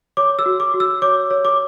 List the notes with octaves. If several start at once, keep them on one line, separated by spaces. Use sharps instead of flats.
C#5 D6
E6
F#4
D6
F#4
E6
C#5 D6
C#5
D6